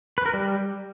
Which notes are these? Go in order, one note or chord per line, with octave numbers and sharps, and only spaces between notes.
B4
A#4
G3